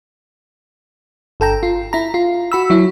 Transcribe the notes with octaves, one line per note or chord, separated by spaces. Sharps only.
G1 A4 G5 A#5
F4
E4 A#5
F4
F#4 B5 E6
F#3 E4